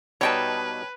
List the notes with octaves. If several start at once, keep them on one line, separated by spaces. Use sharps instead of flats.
B2 G3 D#4 B4 C#5 G5 A5